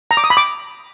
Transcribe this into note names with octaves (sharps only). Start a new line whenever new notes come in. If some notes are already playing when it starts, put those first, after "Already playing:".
A#5
D6
D#6
B5
D6